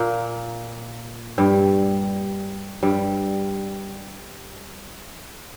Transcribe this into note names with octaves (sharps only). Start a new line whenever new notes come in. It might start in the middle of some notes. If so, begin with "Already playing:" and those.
Already playing: A#2 A#3
G2 G3
G2 G3